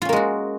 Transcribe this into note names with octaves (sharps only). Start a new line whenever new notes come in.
G#3 A#3 C#4 F4 F#4